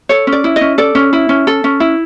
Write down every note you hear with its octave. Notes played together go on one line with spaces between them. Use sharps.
A4 C#5
C#4
D5
E4
D#5
C#4
A4 D5
C#4
E4
C#4
A4
C#4
E4